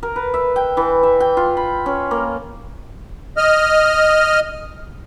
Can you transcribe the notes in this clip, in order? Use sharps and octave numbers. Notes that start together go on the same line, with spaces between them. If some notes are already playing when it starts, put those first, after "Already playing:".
A#4
B4
E5
G5
E3
E5
G5
F4
B5
C#4
A#3
D#5 F6